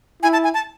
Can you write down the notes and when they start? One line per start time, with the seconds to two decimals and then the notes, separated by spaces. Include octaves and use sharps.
0.22 E4 G#5
0.33 A5
0.44 G#5
0.54 A5